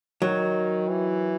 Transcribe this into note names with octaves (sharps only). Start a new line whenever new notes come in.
D#3 F#3
E3